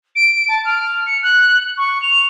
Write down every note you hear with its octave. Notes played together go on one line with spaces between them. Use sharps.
D7
A5
F6
C#7
F#6
C#6
F7